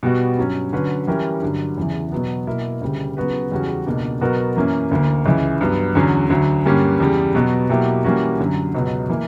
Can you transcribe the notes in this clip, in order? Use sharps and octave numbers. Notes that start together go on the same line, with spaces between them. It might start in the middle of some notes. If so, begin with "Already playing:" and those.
B2 G3 B3 F#4
G2 F#3 C#4
D3 F#3 C#4 F#4 B4
E3 G3 C#4 G4 A#4
G2 D3 F#3
E2 C#3 E3
B2 F#3 B3
B2 A#3 E4 A#4
D2 C#3 G3
C#3 F#3 B3 F#4 B4
E2 C#3 G3 C#4 F#4
C#2 B2 A#3 D4
B2 F#3 B3 F#4 A#4
F#2 E3 A#3 C#4
D2 D3 A#3
C#2 C#3 E3
G2 F#3 B3
E2 D3 F#3 C#4
D2 D3 F#3
G2 D3 G3 A#3 C#4
E2 C#3 G3
B2 F#3 B3 F#4 B4
B2 F#3 A#3 E4 G4
E3 G3 A#3 C#4 F#4
F#2 D3 F#3
C#2 B2 F#3 B3
E3 A#3